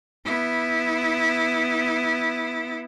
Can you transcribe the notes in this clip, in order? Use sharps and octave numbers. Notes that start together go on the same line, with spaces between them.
B3 E4